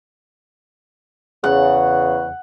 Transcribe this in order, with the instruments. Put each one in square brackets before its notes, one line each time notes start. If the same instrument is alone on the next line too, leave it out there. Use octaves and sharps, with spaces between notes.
[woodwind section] E2 C#3 [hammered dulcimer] F#5